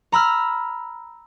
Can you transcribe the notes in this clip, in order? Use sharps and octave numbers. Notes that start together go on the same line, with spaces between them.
A#5 B5 E6 F6